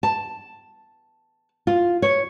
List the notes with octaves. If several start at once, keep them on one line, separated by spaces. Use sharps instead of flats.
A5
F4
C#5